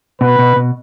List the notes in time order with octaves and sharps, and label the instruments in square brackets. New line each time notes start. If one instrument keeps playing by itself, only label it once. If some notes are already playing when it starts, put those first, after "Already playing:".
[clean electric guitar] B2 [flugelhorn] B4
[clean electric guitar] B2
B2